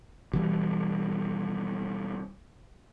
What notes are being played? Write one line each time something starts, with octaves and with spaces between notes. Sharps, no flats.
B2 E3 G3